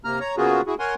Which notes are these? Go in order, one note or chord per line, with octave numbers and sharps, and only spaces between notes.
C3 A#3 A#5 F6
C#5 A#5
C#3 A#3 B3 F4 F#4 G#4
E4 F#4 G#4
A#4 C#5 F#5 G#5 C6